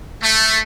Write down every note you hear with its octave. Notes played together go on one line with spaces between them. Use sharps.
A3